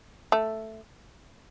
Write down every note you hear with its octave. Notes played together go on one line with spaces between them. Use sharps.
A3